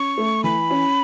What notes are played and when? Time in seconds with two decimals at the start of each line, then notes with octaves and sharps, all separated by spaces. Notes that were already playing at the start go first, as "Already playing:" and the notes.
Already playing: C#4 C#6
0.18 A3
0.44 E3 B5
0.71 C#4